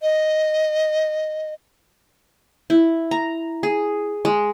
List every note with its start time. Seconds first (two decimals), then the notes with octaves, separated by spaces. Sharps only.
0.02 D#5
2.70 E4
3.11 A#5
3.63 G#4
4.25 G#3